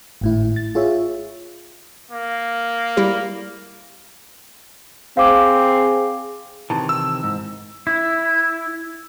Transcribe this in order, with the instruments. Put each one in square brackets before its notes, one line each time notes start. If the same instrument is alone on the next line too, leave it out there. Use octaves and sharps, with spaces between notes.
[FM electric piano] G#1 A2 E4
A6
F4 G#4 C#5 E5
[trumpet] A#3
[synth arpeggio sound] G3 E4 G4
[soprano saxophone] C4 [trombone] G#4 [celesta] F5 D6
[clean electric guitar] C3 D#3 E3 [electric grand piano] A5
[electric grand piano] E6
[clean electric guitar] G#2
[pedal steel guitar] E4